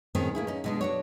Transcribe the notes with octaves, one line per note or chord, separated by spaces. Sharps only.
A2 D#3 C4 C#4 G#4
A#3 E4 G#4
C#4 D#4
B2 G#3 D4
D4 F#4 C#5